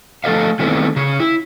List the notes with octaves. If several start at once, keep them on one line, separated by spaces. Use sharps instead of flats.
F3 A3 A4 D#5 F5
D#3 G#3 A3 B3 C4 E4
C#3 G#4
E4